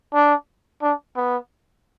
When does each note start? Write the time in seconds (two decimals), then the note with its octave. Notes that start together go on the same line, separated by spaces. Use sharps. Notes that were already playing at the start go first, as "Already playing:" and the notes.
0.13 D4
0.82 D4
1.17 B3